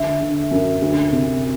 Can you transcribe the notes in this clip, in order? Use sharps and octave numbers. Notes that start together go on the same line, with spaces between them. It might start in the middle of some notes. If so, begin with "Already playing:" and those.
Already playing: D3 E5
D3
F#2
D2
C3